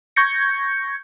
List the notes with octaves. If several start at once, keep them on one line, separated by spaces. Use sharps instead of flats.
C#6 G6 G#6 A#6 C#7